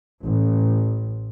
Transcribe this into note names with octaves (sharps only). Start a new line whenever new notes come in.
A1